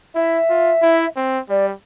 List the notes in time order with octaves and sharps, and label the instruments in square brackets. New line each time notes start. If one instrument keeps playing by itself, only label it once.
[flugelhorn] E4 [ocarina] E5
[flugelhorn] F4
E4
C4
[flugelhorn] G3 [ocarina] D5